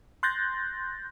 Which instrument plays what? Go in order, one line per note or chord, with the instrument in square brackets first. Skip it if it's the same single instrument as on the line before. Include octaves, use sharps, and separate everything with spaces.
[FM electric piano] C6 F#6 G6 A6 A#6